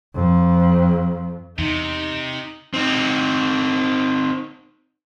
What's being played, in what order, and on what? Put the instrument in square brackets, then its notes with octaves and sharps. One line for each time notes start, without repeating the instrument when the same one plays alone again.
[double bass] F2
[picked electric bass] E2 [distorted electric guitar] C3 [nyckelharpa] D#4
[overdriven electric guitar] C4 D#4